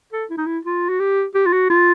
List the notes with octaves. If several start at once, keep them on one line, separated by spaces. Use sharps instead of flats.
A4
E4
D#4
E4
F4
F#4
G4
G4
F4
F#4
F4